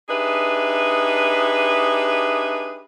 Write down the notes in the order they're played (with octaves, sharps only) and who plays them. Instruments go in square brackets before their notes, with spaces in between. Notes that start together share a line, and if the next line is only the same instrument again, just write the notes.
[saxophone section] D4 D#4 G4 G#4 B4 E5